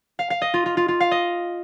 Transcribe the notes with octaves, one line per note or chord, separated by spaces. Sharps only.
F5
F5
D#5
F4
F4
F4
F4
F5
D#5